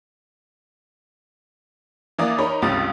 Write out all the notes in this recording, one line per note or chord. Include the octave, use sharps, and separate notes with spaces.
E3 A#3 D5 D#6
D#4 A#4 C#5 B5
C#2 G2 C3 F4 D#6 A6